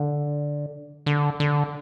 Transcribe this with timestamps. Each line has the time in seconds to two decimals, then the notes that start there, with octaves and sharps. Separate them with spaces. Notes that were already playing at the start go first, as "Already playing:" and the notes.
Already playing: D3
1.06 D3
1.40 D3